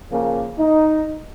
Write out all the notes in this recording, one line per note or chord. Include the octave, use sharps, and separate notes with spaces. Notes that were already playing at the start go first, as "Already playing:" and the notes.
C#3 F3 A#3
D#4